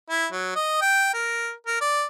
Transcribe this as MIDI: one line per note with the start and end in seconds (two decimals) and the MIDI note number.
0.10 0.27 64
0.32 0.53 54
0.55 0.78 75
0.82 1.11 79
1.14 1.52 70
1.66 1.79 70
1.81 2.04 74